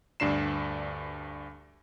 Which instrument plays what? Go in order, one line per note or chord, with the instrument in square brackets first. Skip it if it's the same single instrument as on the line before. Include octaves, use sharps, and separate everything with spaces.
[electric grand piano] D2 G2 D4 C7 E7